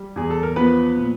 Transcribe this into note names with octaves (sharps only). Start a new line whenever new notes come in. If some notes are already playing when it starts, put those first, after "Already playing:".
Already playing: G3
E2 G#4
A4
A#4
F3 B3 B4
A#2